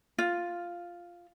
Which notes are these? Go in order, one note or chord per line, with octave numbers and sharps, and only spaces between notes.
F4